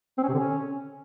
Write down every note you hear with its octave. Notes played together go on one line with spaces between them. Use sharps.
C4
C#4
C3
D3
C#4